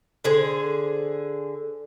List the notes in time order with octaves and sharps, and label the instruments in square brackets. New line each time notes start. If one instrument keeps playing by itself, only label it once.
[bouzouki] D3 G#4 C5